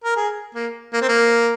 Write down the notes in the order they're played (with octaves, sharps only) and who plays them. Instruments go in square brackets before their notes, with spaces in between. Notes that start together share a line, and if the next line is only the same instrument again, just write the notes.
[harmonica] A#4
G#4
A#3
A#3
C4
A#3